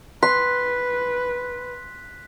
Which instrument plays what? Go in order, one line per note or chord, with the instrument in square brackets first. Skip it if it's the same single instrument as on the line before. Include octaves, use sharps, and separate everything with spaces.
[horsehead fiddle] B4 [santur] C6 [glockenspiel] F#6 B6